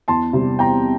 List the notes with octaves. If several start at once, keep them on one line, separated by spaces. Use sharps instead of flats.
E2 A5 C6
C3 G3
E2 G5 A#5